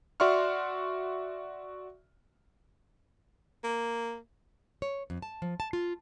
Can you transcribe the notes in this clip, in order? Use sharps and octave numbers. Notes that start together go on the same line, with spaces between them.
F#4 D5 E5 C6 C#6 F6
A#3
C#5
F2
A5
F3
A5
F4